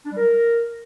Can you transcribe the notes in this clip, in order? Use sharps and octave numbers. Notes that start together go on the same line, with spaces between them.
D4
G3
A#4